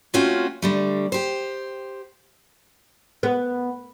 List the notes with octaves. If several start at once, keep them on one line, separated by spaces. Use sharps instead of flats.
A3 C4 C#4 F4 F#4
D3 G3 A3
G4 C5
B3